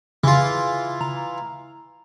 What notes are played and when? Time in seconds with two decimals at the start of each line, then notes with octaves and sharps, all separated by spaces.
0.24 C#3 E3 F4
1.01 A#5